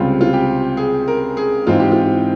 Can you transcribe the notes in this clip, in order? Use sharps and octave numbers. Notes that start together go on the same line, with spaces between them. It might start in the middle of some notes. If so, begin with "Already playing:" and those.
Already playing: C#2 C3 G3 C4 F4
F4
G4
G#4
A#4
G#4
G#2 E3 G#3 C4 F4
G4
F4